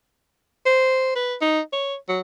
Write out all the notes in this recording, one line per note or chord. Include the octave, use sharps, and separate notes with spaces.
C5
B4
D#4
C#5
F#3